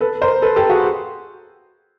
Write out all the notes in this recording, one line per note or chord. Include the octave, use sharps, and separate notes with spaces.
A4 B4
A#4 C5
A4 B4
G4 A4
F#4 G#4